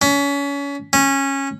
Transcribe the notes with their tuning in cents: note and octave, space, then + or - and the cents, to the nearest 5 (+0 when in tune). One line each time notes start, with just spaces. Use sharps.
C#4 +30
C#4 -15